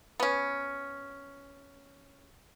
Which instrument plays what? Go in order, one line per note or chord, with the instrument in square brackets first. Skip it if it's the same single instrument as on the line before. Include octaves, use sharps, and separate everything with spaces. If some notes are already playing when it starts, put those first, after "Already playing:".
[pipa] B3 C#4